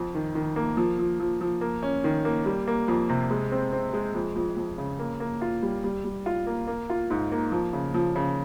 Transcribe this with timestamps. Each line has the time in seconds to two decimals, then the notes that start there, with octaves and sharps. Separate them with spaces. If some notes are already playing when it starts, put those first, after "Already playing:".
Already playing: F2
0.15 D#3
0.35 D#3
0.56 A#3
0.77 F3
0.99 F3
1.20 F3
1.41 F3
1.61 A#3
1.83 C#4
2.04 D#3
2.25 A#3
2.46 G3
2.67 A#3
2.88 F2
3.09 C3
3.31 G#3
3.52 C4
3.73 C4
3.93 G#3
4.15 F2
4.36 F2
4.57 F2
4.78 C#3
4.99 A#3
5.20 A#3
5.41 F4
5.63 G3
5.84 G3
6.05 G3
6.26 F4
6.47 A#3
6.67 A#3
6.90 F4
7.10 G#2
7.32 A#3
7.52 F3
7.73 C#3
7.94 F3
8.16 C#3